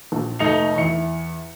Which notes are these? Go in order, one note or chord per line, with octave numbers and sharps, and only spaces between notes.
A#1
F1 A3 D#4 C#7 F7
E2 E5 C#7